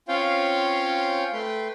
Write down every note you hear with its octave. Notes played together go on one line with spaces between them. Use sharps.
C4 C#4 F4 C#5 F5 G5
A3 B4 G5 C6